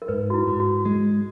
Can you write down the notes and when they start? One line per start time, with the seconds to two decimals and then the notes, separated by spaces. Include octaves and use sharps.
0.02 A#4
0.08 G#2 B4
0.30 F#4
0.34 E4
0.47 G#2
0.60 F#4
0.85 G#3